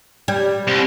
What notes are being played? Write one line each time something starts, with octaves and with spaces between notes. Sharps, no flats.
G3
C2